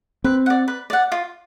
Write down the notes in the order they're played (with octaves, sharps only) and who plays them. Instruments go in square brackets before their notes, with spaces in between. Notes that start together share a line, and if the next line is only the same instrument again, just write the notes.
[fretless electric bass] C4 [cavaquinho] B4
[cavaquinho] D5 F#5
B4
D5 F#5
F4